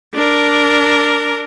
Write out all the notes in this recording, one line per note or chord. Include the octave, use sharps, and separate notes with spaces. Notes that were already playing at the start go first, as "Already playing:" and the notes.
D4 A#4